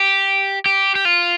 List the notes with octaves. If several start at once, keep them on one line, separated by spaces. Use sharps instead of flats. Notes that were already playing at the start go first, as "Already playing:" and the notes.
Already playing: G4
G4
G4
F4